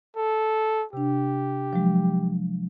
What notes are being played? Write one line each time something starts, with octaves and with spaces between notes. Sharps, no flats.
A4
C3 D4 G4
F3 F#3 G#3